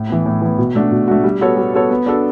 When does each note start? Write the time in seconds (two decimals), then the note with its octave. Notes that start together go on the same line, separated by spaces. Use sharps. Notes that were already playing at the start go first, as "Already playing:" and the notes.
Already playing: A2
0.09 E3 B3
0.26 A2
0.42 E3 B3
0.58 B2
0.75 A3 D4 F#4
0.92 B2
1.08 A3 D4 F#4
1.24 G3
1.41 B3 F#4 A4 C#5
1.57 G3
1.74 B3 F#4 A4 C#5
1.90 B3
2.06 D4 F#4 A4